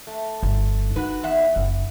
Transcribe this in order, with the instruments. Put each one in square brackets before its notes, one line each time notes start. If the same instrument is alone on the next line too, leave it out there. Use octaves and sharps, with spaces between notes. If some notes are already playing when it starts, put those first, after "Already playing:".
[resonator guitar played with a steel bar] A3
[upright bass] G1
[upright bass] D#4 [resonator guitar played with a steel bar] F#4 B4
[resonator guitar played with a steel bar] E2 E5 F#5
[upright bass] F#1